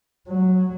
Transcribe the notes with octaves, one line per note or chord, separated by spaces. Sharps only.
F#3